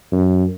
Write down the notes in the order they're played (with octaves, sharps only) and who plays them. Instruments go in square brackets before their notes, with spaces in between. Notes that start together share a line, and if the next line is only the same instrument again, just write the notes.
[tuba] F#2